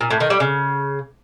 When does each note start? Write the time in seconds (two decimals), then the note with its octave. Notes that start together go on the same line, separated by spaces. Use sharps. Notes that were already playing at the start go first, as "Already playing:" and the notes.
0.01 A#2
0.10 A2
0.20 D#3
0.30 G3
0.40 C#3